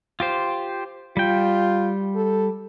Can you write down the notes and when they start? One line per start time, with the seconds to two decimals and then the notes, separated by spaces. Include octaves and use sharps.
0.20 F4 G4 C5
1.17 G3 F4 G5
2.15 A4